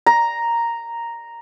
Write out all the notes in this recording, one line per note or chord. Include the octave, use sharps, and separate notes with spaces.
A#5